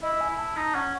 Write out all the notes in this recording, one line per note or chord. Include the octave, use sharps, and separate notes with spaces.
E4 D#5
G#5
E4
A5
D#4 A5
C#4 F#5